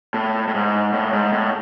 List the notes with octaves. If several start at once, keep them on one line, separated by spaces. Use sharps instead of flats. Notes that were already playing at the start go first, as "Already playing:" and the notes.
A2
A2
G#2
A2
G#2
A2